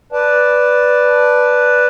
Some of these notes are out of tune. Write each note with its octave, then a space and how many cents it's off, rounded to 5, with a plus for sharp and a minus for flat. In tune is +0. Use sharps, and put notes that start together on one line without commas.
B4 +0 D5 +0 A5 +0